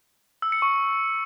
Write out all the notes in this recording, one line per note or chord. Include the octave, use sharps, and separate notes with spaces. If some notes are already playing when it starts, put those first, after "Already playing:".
E6
C#7
C#6